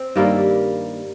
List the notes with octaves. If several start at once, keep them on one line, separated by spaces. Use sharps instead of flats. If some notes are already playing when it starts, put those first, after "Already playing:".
Already playing: C4
G2 D#3 G3 A#3